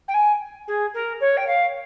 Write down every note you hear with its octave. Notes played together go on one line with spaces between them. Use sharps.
G5
G#5
G#4
A#4
C#5
G5
F5